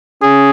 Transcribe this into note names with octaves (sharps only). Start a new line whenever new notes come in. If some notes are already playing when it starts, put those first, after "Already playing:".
C#4 G#4